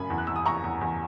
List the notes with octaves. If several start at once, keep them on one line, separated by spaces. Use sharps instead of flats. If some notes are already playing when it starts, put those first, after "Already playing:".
Already playing: F#2 G#5 B5
E2
F#6
E2 E6
D#6
E2 A#5 C#6
E2
E2